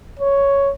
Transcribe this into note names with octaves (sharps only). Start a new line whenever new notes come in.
C#5